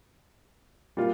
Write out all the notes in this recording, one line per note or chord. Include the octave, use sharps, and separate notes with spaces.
A#2 G3 F4